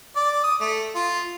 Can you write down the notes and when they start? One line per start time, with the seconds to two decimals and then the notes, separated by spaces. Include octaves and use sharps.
0.16 D5
0.44 D#6
0.61 A3
0.95 F4